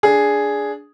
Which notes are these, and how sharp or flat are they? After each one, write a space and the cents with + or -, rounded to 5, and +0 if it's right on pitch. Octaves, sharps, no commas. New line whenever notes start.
D4 -10 G#4 +0